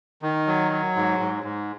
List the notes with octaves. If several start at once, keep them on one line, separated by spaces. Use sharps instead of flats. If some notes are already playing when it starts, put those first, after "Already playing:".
D#3
F#3
F#3
G#2
G#2
G#2